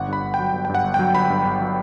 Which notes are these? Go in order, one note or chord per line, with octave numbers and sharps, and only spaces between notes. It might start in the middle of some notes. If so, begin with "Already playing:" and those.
Already playing: G1 F#5
G2 B5
G1
G5
F#3
G1
G5
G2
F#5
G1
F#3 G5
G1 B5
G2
G1
F#3